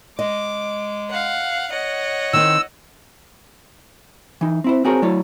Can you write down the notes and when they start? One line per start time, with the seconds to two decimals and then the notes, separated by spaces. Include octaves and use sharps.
0.19 G#3 D#5 D6
1.10 F5 F#5
1.72 C#5 D#5 F#5
2.33 D#3 C4 E6
4.41 E3 D#4
4.64 C4 E4 C5
4.85 C4 F#4 G#4 A#4 C5 C#5
5.02 F#3 A3 E4 C#5 D5